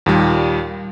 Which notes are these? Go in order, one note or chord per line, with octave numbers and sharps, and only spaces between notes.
D#2 A#2 G3